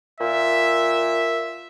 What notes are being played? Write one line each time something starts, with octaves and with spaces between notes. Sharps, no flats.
A#2 E5